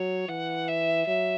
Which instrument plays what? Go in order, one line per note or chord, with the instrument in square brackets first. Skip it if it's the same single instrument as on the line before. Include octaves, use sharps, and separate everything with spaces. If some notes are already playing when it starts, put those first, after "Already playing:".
Already playing: [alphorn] F#3 [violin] C#5
[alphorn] E3 [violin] F#5
[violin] E5
[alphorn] F#3 [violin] E5